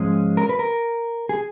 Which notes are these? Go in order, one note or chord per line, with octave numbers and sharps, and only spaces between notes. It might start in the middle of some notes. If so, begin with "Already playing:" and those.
Already playing: G#2 F3 G#3 C#4
A#4
B4
A#4
G#4